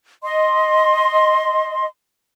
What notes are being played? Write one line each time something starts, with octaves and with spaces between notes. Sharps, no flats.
D#5 C6